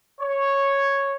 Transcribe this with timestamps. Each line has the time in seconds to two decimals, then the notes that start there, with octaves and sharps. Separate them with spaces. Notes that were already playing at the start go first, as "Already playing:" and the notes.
0.21 C#5